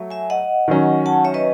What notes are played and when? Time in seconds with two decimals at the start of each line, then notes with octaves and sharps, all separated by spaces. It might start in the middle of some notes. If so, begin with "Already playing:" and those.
Already playing: F#3 A3
0.10 E5 G#5
0.30 D#5 F#5
0.68 D#3 F#3 C#4
1.06 F#5 A5
1.25 C#5 E5
1.34 B4 D#5